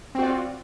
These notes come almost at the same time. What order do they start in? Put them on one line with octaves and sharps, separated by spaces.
C4 F#4 D5 F4